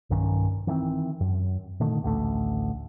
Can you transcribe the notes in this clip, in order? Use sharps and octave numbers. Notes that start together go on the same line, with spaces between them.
B1 G2 D#3 C#4
D#3 E3 A3 C4
F#2
A#2 D3 D#3 A3
A1 D2 G#3 A3